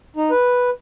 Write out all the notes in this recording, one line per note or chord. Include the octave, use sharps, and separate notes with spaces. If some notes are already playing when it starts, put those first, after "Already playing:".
D#4
B4